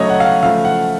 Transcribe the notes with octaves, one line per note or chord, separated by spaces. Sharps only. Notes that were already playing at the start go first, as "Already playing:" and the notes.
Already playing: C#3 F#3 A3 C#5 D#5
F#5
F5
F#5
C#3 F3 A3 F5
F#5